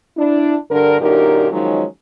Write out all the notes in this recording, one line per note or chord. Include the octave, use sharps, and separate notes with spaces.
D4 E4
G2 D3 A#4
F#2 A#2 D3 D#4 G4 A#4
D#3 F3 F#3 G#3 C#4 D#4